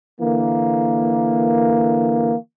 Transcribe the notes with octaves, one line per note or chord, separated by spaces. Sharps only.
D3 E3 A#3